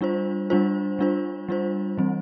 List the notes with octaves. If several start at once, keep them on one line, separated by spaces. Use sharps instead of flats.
G3 D4 F4 C5
G3 D4 F4 C5
G3 D4 F4 C5
G3 D4 F4 C5
E3 G3 C4